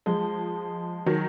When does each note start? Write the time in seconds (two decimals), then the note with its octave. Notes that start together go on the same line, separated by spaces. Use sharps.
0.06 F3 G#3
1.06 D#3 F#3